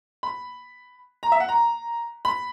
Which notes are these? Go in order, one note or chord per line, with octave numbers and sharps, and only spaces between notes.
B5
A#5
E5
F#5
A#5
B5